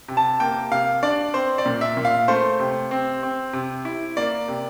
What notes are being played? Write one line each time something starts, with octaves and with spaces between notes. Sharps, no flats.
C3
A5
A#3 G5
C3 F5
D4 D5
C4 C5
D5
A#2
E5
A#2
F5
A3 C5
C3
C4
C4
C3
E4
A#3 D5
C3